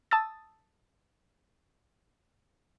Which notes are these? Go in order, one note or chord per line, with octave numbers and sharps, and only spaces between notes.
A5 D#6 E6 A6